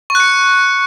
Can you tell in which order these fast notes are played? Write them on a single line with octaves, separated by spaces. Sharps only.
C#6 F#6 C#7